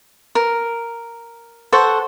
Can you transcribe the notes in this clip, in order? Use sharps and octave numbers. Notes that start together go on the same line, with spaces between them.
A#4
A4 C5 F#5 C#6